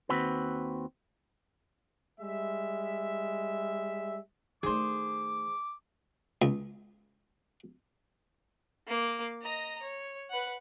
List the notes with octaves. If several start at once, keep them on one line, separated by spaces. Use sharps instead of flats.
D#2 C4 F#4 B4
G3 G#3 E5
D#3 A3 G#4 C5 D6
C#2
A#3 D6
D#5 A#5
C#5
B4 F#5